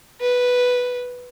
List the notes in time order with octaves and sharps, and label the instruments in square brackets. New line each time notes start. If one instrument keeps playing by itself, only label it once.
[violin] B4